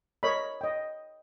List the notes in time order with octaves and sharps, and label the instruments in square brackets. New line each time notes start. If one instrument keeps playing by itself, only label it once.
[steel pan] A#4 C#5 D#5 B5
D#5 G5